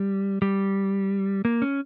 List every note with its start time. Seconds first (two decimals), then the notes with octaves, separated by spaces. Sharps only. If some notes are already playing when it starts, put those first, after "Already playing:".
Already playing: G3
0.42 G3
1.45 A#3
1.62 C#4